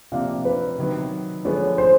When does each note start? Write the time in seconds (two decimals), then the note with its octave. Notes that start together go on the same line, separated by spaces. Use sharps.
0.12 C3 F3 A#3 D4 F4 F5
0.45 B4
0.78 C3 D#3 F#3 B3
1.45 D3 F3 G#3 B3 C#5
1.78 C5